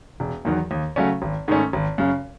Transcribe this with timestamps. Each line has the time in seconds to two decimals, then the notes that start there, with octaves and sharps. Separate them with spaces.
0.20 E1
0.45 E2 D#3 F#3
0.71 D#2
0.96 C#3 F#3 A3 C#4
1.22 G#1
1.48 G#2 D#3 A3 C#4
1.73 G#1
1.98 F#2 C#3